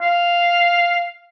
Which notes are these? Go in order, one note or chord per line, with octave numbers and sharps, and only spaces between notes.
F5